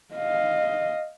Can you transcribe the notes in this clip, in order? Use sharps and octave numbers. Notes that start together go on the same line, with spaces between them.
D#5 F5